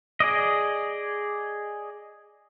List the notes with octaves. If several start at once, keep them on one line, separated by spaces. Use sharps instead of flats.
G#4 D5 D#5